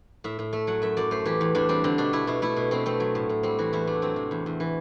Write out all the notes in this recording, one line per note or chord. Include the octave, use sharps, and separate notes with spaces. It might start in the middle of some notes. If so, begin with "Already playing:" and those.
A2 E5
A2
A3 E5
F#3 F#5
F#2 E5
F#2 D5
A3 C5
E3 G4
E2
E2 D4
G3 C4
D3 C4
B2 D4
A3 E4
B2 E4
A3 E4
B2
B2 C4
A3 C4
F#3
A2
A2
G3 C4
E3 F#4
E2 E4
A3 D4
F#3 C4
C3
E2
E2
E3